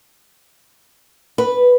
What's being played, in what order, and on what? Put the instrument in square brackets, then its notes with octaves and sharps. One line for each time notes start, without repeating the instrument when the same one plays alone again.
[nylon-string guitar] B4